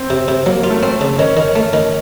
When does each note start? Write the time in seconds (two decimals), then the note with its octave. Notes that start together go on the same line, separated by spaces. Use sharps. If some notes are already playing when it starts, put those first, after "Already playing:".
Already playing: C4
0.10 C3
0.28 C3
0.46 F#3 A#3
0.64 F4
0.70 A3
0.83 C4
1.01 C#3
1.19 D#3 C#4
1.37 D#3
1.56 A3
1.73 D#3